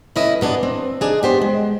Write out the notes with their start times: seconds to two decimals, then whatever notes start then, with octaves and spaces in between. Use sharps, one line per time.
0.16 A3 C#4 E4 B4 D#5
0.41 B2 B3 D4 G#5
0.63 C4
1.01 D4 D#4 G#4
1.23 B3 G4 C5 C#5
1.42 G#3